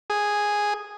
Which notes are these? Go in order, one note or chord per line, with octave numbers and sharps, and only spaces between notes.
G#4